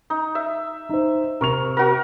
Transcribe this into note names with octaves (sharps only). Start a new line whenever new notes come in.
D#4
E5
D#4 C5
C3 A#4 C#6 F7
F#4 A#4